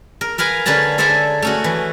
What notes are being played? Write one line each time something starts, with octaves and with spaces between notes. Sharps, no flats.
A#4
A#4 B4 F5 G#5 A#5
D3 C#4 B4 A5 A#5
A4 C5 D5 E5 G#5 A#5
A3 C#4 F#4
E3